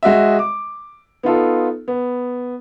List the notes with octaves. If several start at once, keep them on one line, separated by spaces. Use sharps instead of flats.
G#3 F#4 D#5 E5
D6
B3 D#4 F4 A4
B3